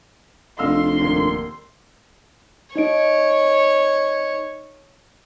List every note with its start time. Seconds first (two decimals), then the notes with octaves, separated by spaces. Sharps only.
0.59 F1 D4 A4 D#5 F5 C6 E6
1.01 D#1 A#3
2.76 D#4 C#5 D#5 D7